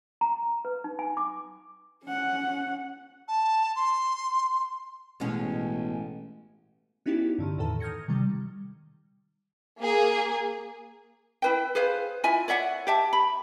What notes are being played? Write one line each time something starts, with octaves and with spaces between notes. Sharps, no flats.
A#5
B4
D#4
G#5
D6
C#4 F#5
A5
C6
A1 B2 G#3 C#4
B3 C#4 D#4 E4 F#4 G4
G2 D3 D#3
E2 A2 D#3 A4 A5
D#6 F6 G6 G#6 A#6 C#7
C3 D#3 G3
A#3 G#4
E4 B4 G5
G#4 B4 C5 F5
E4 F4 E5 G#5
C#5 D5 E5 F#5
G4 E5 A5
B5